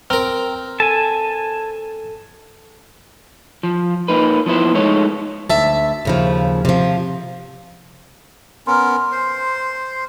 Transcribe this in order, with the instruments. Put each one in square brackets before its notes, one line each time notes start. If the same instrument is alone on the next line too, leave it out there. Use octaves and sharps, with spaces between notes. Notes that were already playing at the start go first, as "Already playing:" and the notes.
[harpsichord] C4 A#4 [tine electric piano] G5 A#5 F6
[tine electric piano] A4 [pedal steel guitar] G#5 A5
[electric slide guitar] F3
A#3 D#4 B4
F3 B3 E4 C5
G#3 A3 D#4 C#5
[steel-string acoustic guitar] D2 E5 A5
D#2 C#3 F3
C3 F3
[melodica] B3 C#4 A#4 [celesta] C6 F6
[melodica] C5